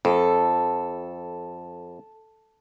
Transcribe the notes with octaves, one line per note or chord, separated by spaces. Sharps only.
F2 A4